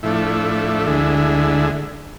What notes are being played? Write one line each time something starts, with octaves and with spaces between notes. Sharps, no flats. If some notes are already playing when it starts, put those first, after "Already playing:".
A2 F3 A3 D4 E4
D2 D3 G#3 E4